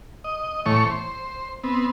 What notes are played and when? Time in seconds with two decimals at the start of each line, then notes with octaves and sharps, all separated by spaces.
0.24 D#5
0.66 A2 E3 A3 C#5 C#6
0.86 C5
1.64 B3 C4